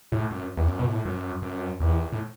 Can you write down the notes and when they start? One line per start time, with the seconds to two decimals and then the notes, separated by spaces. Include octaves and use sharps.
0.12 A2
0.31 F#2
0.57 E2
0.68 F#2
0.79 B2
0.87 A2
1.05 F#2
1.42 F#2
1.80 E2
2.12 A2